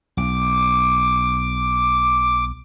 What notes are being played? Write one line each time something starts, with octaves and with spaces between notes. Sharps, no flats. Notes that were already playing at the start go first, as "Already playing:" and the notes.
B1 D6